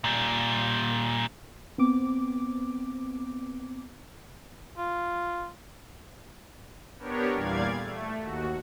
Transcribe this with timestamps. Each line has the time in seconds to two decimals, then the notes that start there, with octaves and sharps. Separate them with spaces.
0.04 A#2 G3
1.78 B3 C4 D6
4.77 F4
6.99 B3 D4 G4 A#4 C#5
7.33 E2 A#2 G3 D5 F5 G#6
7.77 A3
8.20 D#2 F#4